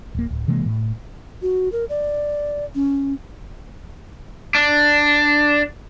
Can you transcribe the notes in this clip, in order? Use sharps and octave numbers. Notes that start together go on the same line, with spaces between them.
D1 A#3
D1
C3 E3 G#3 A#3
A2
F#4
A#4
D5
C#4
D4